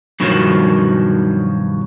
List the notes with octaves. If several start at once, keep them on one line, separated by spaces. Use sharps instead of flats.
G2 B2 D#3 F3 F#3